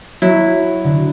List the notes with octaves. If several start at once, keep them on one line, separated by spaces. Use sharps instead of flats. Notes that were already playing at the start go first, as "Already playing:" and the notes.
F#3 E4
D3